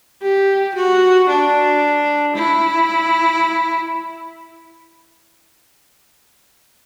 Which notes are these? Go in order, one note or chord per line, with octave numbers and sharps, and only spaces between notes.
G4
F#4
D4
E4